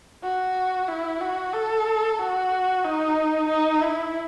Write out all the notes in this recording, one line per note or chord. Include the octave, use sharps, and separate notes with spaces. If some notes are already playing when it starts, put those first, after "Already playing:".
F#4
E4
F#4
A4
F#4
D#4
D#4
E4